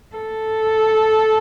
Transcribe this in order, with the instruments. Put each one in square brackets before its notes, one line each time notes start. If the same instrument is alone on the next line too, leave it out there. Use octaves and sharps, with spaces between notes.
[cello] A4